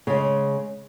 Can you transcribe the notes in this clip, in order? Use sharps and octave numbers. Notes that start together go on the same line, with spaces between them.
C#3 G#3